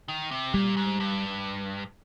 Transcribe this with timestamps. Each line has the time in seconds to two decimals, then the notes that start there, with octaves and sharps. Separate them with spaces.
0.08 D#3
0.31 C3
0.53 A#2 G3
0.77 G#2
1.00 G2